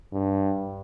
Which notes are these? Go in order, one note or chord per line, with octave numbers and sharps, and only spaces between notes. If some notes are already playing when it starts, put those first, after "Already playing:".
G2